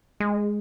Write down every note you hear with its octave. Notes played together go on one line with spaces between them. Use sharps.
G#3